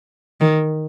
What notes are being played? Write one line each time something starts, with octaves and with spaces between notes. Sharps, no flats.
D#3